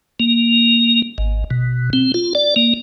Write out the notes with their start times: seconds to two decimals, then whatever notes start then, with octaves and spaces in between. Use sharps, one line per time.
0.20 A#3
1.18 G#1
1.51 B2
1.93 C4
2.14 F4
2.35 D5
2.56 A#3